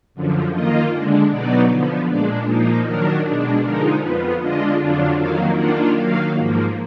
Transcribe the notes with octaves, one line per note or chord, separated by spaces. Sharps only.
F#2 D3 F3
D#3 A#3 F4 D#5
D3 G#3 D4
B2 F#3 B3 D#4 D5
D3 F3 B3
A#2 G#3 D4 D5
A#2 F3 A#3 D#4
D#3 F#3 D4 A#4
B2 G#3 D4
D3 F3 G#3 D#4 A#4
F2 F3 B3 B4
D3 G#3 D4 F4 D#5
F2 D3 F#3 D4 F4
F2 D#3 F#3 A#3 F5
D#3 A#3 D4 F4 F#5
D#3 F#3 A#3 F5
G#2 F3 A#3